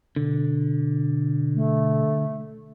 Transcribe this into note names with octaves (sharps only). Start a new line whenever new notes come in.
B2 D3
A3